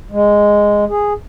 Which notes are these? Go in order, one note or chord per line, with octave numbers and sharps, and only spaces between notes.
G#3
G#4